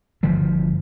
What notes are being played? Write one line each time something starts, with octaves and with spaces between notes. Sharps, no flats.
G1 D3 F3 G3